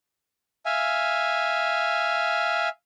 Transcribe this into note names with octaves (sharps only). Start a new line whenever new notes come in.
E5 F5 G#5